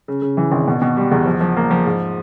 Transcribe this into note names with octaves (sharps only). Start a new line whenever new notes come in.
C#3
C#3
E3
G#1
B2
B2
G3
E2
F3
F3
A#3
F3
G#2